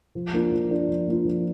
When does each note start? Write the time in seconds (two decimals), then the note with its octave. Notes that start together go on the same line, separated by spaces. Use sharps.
0.15 F3
0.33 A#3 D4 F4
0.52 F3
0.71 A#3 D4 F4
0.89 F3
1.07 A#3 D4 F4
1.25 F3